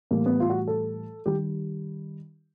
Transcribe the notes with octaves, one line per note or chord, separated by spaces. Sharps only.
A2 E3 G3 A#3
B3
F4
F#4
A4
D#3 G3 G4